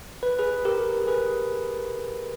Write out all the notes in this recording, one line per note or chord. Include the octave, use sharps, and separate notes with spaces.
B4
G#4 B4
G4 A#4
G#4 B4